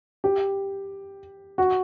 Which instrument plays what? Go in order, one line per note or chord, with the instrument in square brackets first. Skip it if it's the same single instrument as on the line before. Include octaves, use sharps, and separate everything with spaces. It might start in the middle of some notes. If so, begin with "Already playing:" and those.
[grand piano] G4
F#4